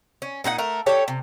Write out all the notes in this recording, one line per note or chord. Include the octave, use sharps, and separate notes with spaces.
C#4
A#2 D#4 F#4 F#5
A3 A#4
G4 A4 C#5
C3